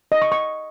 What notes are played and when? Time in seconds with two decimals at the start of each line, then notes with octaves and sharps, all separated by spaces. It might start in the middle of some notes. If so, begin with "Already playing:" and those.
0.12 D#5
0.22 C#6
0.32 C#6